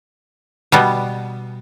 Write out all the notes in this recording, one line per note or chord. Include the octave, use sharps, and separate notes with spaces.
B2 G3 B3